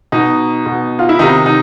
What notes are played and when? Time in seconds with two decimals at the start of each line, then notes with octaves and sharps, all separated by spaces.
0.12 B2 D#4
0.66 B2
0.99 F4
1.09 E4
1.19 C3 D#3 D#4
1.46 D#4